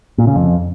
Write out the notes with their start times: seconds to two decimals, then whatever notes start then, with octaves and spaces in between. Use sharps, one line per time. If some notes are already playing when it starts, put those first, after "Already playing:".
0.18 A#2
0.27 C#3
0.36 F2